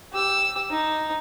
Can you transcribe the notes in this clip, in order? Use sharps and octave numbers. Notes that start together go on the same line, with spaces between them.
G4 E6
D#4